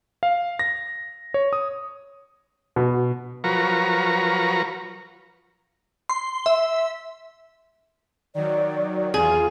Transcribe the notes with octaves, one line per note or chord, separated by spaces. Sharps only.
F5
A#6
C#5
D#6
B2 F#4
F3 F#3 A#4 B4 A#5 C#6
C6
E5
D#3 F#3 D5
E2 F4 G#4